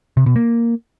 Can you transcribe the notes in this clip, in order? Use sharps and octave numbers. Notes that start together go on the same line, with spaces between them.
C3
B2
A#3